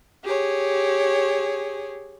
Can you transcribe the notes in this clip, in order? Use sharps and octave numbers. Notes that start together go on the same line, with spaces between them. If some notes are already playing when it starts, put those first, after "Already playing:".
G4 G#4 C#5